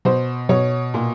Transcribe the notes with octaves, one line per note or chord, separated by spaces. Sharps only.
B2 C5
B2 C#5
A#2